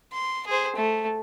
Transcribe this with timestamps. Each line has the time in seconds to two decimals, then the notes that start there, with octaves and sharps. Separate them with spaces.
0.12 C6
0.47 G#4 C5
0.76 A3